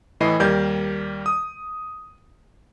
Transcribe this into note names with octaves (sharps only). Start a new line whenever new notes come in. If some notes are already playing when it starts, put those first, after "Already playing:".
A2 E3 D#5 B5 C7
D#2 G3 A#4 D5 G6 G#6
D#6